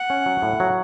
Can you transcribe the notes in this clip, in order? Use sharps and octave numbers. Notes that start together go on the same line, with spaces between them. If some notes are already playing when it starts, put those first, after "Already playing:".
Already playing: F#5
C#4
F#3
A2
F#3